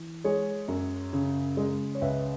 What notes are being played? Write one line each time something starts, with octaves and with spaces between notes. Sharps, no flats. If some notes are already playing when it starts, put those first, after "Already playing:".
Already playing: E3
G#3 G#4 C#5
F#2
C#3
G#3
C#5
C#2 B4 E5